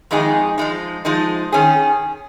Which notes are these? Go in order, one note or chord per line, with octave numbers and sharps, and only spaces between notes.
F2 D#3 G#3 D#4 G#4
F3 G#3 D#4
F3 G#3 D#4
D#3 C#4 G#4